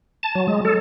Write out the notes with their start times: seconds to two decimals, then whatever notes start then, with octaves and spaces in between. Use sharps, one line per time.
0.23 A5
0.35 F#3
0.48 G#3
0.65 A4